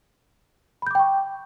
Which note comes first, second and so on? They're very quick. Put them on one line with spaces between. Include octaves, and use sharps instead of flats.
B5 G6 D6 G5 C#6